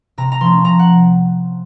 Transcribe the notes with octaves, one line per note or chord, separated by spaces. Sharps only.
C3 A#5
A#5
F3 A3 C#4 C6
C3 A#5
F#5